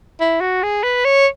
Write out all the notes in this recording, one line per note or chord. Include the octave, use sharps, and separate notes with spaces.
E4
F#4
G#4
B4
C#5